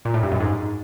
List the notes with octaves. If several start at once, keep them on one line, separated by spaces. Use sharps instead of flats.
A#2
A2
G2
F#2
G#2